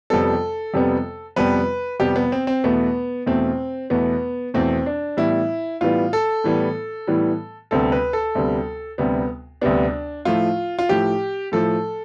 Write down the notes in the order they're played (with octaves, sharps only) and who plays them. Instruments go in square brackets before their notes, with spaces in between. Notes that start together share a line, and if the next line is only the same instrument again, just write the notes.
[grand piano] F2 C3 G3 B3 A4
F2 C3 G3 B3
F2 C3 G3 B3 B4
F2 C3 G3 B3 G4
B3
C4
C4
E2 B2 A3 B3
E2 B2 A3 C4
E2 B2 A3 B3
E2 B2 A3 C4
D4
A2 E3 G3 B3 E4
A2 E3 G3 B3 F4
A4
A2 E3 G3 B3
A2 E3 G3 B3
D2 C3 G3 B3 A4
B4
A4
D2 C3 G3 B3
D2 C3 G3 B3
D2 C3 G3 B3 D4
A2 F3 A3 F4
F4
A2 F3 A3 G4
A2 F3 A3 A4